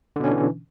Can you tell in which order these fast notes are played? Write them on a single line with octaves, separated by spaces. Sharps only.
D3 B2 C#4 D4 E3